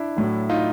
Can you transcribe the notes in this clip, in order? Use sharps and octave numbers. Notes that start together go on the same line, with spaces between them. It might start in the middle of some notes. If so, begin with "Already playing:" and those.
Already playing: D4 E4
A2 F#3
D#4 F4